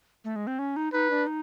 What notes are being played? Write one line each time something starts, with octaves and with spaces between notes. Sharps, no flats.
A3
G#3
C4
C#4
D#4
D#4 B4
D4
D#4